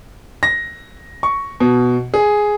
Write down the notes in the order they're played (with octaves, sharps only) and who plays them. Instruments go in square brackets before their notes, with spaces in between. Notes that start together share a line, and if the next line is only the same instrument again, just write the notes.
[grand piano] A#6
C#6
B2
G#4